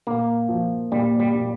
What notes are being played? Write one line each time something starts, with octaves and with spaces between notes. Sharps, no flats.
A#2 A#3
F3
A#2 G3
G3
A#2